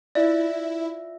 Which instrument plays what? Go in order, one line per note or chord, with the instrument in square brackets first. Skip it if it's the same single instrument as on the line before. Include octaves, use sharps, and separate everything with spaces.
[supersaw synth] E4 [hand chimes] F4 E5 [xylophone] D5